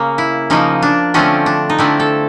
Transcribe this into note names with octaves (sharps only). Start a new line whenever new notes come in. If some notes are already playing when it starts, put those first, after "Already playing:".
Already playing: C#3 A#3
E4
C#3 F3 A#3 D#4
D4
D3 F3 A3 C4 C#4
D4
D#4
D3 F3 A3 C4 E4
A4